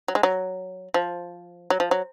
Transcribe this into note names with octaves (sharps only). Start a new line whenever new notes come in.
F#3
G#3
F#3
F3
F#3
F3
F#3